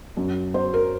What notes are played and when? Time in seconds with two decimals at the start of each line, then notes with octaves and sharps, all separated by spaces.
0.17 F#2
0.54 F#3 C5
0.74 A#4